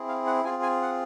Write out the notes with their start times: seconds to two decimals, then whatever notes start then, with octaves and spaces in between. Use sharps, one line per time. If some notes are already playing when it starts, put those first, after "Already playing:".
Already playing: C4 E4 G#4
0.08 F5
0.27 F#5
0.44 C4 F4 G#4 G#5
0.63 G#5
0.82 F#5